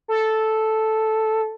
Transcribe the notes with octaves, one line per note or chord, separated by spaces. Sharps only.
A4